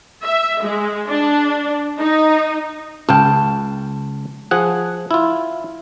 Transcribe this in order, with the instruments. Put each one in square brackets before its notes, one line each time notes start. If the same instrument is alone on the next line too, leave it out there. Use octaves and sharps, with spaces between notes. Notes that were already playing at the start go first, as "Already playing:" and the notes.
[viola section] E5
G#3
D4
D#4
[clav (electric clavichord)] C#2 F5 G5 [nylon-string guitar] A5
[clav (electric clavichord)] F3 G#4 F#5
E4 F4